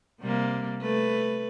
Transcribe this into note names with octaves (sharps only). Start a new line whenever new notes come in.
C3 G3 A#3
A3 B4